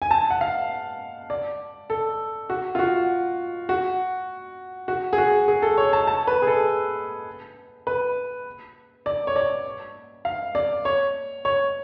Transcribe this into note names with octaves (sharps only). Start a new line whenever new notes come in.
G#5
A5
F#5
F5
D5
A4
F#4
F4
F#4
F#4
F#4
G#4
F#4
G#4
A4
C#5
A5
A5
B4
G#4
A4
B4
D5
C#5
D5
F5
D5
C#5
C#5